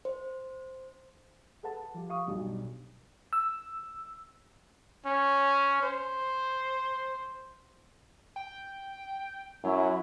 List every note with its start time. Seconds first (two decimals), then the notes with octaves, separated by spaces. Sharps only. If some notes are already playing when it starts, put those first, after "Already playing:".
0.05 C5
1.63 G#4 A4 B4 F#5 A5
1.94 F3 G4
2.09 F5 C#6 D#6
2.26 B1 G2 B2 F#3 G3
3.33 E6
5.05 C#4
5.82 C5
8.36 G5
9.64 F#2 F#3 E4